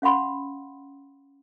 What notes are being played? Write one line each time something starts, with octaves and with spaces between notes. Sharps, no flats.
C#4 F5 F#5 B5 C6